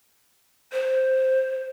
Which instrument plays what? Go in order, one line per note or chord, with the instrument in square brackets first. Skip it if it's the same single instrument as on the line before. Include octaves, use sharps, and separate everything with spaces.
[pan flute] C5